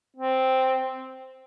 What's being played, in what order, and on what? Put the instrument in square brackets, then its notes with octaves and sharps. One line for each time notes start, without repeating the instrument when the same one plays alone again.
[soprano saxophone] C4